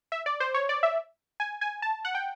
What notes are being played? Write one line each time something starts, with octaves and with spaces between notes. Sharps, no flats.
E5
D5
C5
C#5
D5
E5
G#5
G#5
A5
F#5
G5